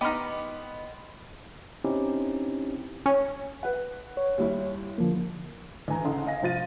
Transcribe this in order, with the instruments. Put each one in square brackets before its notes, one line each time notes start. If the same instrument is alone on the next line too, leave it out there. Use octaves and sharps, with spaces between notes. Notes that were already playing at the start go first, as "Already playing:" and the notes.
[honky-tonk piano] B3 B5 C6 [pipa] D#4 G4 [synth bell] D#5 [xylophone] G5 F6
[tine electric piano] C4 C#4 D#4 E4 G4
[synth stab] C#4
[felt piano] B4 F#5
[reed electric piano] C#5
[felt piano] D#2 G3 E4
[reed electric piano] D3 F3 A#3
[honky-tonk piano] D2 E3 G#5 A#5
D2 C#3 D#4 A4 F#5 C6
D#5 F5 G#5 A#6
C2 F3 F4 A6 D#7